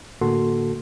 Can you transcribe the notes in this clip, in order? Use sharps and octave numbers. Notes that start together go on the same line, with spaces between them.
A2 D3 A#3 F#4 A4 C6